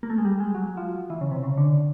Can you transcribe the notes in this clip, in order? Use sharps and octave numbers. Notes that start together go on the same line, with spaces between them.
A#3
A3
G#3
G3
G#3
F#3
F3
E3
C#3
C3
C#3
D3